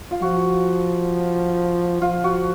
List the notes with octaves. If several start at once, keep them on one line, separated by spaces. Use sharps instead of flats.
F4
F3 F#4
F3 F4
F#4